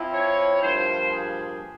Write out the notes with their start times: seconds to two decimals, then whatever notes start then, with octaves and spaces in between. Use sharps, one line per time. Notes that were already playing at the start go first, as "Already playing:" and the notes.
Already playing: F3 C4 E4
0.13 C#5
0.62 G2 F3 A#3 C5
1.11 G#4